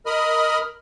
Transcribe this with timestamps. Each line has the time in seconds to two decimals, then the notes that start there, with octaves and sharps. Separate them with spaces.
0.06 A#4 D#5 B5 D#6 F6